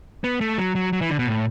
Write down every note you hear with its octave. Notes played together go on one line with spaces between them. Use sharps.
B3
A3
F#3
F#3
F#3
E3
D3
B2
A2